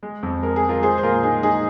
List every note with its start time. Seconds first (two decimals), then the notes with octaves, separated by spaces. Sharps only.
0.03 G#3
0.23 F2
0.43 G#3 A#4
0.56 G#4
0.63 G#3
0.69 F4 A#4
0.83 G#3 G#4 C5
0.98 C5
1.03 A#2 F4 A#4
1.23 G#3 D#4 G#4
1.43 G#3 D#4 G#4